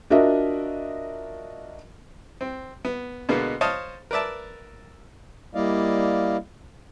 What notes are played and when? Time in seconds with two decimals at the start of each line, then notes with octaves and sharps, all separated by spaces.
0.10 D4 F4 F#4 A#4 D#5 E5
2.41 C4
2.85 B3
3.29 B2 D3 G#3 A#3 B3
3.61 C5 C#5 D#5 F5 A5
4.11 A#4 B4 D5 E5 A5
5.55 G3 A#3 E4 D5 D#5 F5